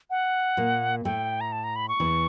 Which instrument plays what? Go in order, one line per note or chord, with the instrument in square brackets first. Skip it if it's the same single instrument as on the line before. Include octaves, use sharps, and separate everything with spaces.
[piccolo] F#5
[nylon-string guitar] A#2 A#3
[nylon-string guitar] A2 A3 [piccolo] G5
[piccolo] A#5
A5
A#5
B5
C#6
[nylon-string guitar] E2 E3